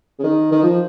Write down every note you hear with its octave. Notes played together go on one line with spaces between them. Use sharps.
C#3
D#3
D#3
F3